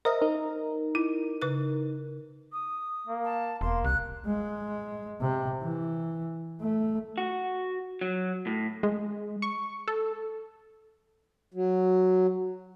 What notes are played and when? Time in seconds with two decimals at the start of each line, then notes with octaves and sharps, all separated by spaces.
0.05 A#4 C5 D#5 E5 F6
0.21 D#4 A#4
0.95 E4
1.42 C#3 B4 F#6
2.52 D#6
3.07 A#3
3.24 A5
3.61 E1 A#3 C6
3.84 C2 F#6
4.26 G#3
5.21 C3
5.62 E3
6.61 A3
7.18 F#4
8.01 F#3
8.47 A2
8.83 G#3
9.42 C#6
9.88 A4
11.54 F#3